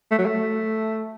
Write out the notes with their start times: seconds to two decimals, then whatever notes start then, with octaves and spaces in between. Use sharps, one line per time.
0.11 A3
0.18 F#3
0.26 A3